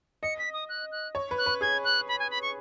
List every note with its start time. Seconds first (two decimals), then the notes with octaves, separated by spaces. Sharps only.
0.23 D#5 C#7
0.39 B6
0.53 D#6
0.69 F#6
0.92 F#6
1.15 C#5
1.31 B4
1.38 F#6
1.46 B4
1.61 G#4 G#6
1.84 F#6
2.08 B5
2.19 G#5
2.31 B5
2.42 C#6